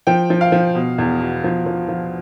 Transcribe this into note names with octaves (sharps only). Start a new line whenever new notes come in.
F3 G5
F3
F5
F3
B2
E2
B2
F3
F3
F3